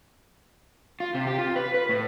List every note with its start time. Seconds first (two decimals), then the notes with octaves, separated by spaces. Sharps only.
1.00 F4
1.15 C3
1.27 G4
1.39 F4
1.56 B4
1.74 B4
1.89 A2